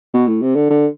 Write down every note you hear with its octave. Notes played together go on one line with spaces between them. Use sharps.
B2
A2
C3
D3
D3